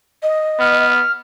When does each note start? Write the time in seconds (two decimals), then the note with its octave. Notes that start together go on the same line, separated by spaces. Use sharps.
0.23 D#5
0.60 B3 F6